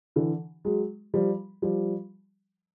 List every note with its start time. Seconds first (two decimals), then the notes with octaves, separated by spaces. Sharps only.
0.16 D3 E3
0.65 F#3 G#3
1.14 F3 G3
1.62 F3 G3